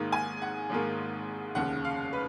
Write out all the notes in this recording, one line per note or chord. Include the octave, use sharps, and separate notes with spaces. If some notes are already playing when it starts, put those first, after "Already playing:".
Already playing: G#1 G#2 D#3 A#3
G#5
F#5
G#1 G#2 D#3 A#3
F1 D#2 C#3 F#5
F5
B4